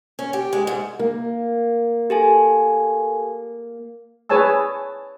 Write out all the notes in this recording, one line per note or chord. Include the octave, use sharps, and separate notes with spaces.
C#4
G4
G#3
G#2
A#3
G4 A4 G#5
G#4 B4 C#5 G#5 A5 E6